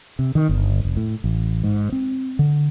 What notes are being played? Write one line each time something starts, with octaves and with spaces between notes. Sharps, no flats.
C3
D#3
G1
F1
A2
A1
G#2
C4
D3